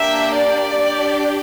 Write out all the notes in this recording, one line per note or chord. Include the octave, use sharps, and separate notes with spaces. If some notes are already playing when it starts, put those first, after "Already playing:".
Already playing: A#3 D4 G4 E5
D5
D4 G4